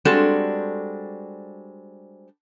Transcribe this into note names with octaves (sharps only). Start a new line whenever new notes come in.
G3 G#3 C4 D4 F#4 A4